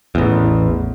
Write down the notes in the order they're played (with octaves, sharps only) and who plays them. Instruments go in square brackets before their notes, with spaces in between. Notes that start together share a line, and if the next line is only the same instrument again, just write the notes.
[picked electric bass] A1 E2